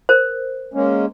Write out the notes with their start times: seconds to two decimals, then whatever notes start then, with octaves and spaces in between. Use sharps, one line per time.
0.09 A#4 C5
0.74 G#3 A#3 C#4